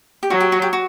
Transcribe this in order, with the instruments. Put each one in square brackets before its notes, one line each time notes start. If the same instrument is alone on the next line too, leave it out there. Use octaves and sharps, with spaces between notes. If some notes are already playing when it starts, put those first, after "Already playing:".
[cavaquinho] G4
[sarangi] F#3 [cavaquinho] F#4
[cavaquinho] G4
F#4
G4
F#4